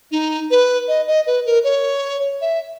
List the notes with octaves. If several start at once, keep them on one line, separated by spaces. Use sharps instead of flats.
D#4
B4
D#5
D#5
B4
A#4
C#5
E5